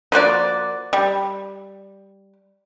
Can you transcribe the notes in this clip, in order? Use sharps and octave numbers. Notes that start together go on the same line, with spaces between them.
F3 A#3 F#4 D5
G3